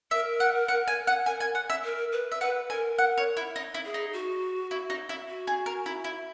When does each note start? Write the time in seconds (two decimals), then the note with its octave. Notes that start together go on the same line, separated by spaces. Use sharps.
0.11 A#4 E5
0.40 F#5
0.68 F#5
0.88 G#5
1.07 F#5
1.26 A#4 G#5
1.40 G#5
1.55 F#5
1.70 E5
1.84 A#4
2.12 B4
2.32 E5
2.41 B4 F#5
2.70 A#4 G#5
2.98 F#5
3.18 C#5
3.37 E4
3.56 D#4
3.74 E4
3.85 G#4
3.94 D#4
4.13 F#4
4.71 E4
4.90 D#4
5.09 E4
5.28 F#4
5.47 G#4
5.66 A#4
5.86 E4
6.04 E4